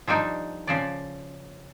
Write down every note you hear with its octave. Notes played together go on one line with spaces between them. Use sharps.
F3 G3 D4 D#4
C#3 F3 D5